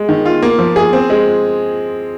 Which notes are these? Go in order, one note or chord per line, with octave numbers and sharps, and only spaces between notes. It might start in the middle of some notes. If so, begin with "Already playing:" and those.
Already playing: G#3
D#3
F4
A#3
F3
G#4
C4
G#3